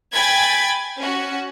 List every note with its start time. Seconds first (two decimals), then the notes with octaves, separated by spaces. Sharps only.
0.14 G5 G#5 B5 G#6 A6
0.99 C#4 F#4